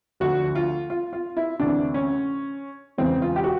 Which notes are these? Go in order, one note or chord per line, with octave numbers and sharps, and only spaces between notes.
D2 D3 F3 F#4
F4
F4
F4
E4
D2 C3 E3 D4
C#4
E1 E2 C#3 E3 C4
F4
G4
F#4